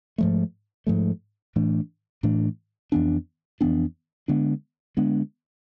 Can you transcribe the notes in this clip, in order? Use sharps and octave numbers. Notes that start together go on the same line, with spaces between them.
G#2 F3 A3
G#2 F3 A3
A2 E3 A3 D4
A2 E3 A3 D4
F2 E3 B3 D4
F2 E3 B3 D4
D3 G#3 B3 D4
D3 G#3 B3 D4